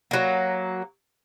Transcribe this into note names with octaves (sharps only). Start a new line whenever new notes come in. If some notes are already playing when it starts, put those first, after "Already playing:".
F#3 A#3